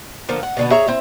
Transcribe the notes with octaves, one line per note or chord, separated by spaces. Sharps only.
D3 F3 A#3
F#5
B2 D3 B3
G#4 C#5 E5 A#5
C4 E4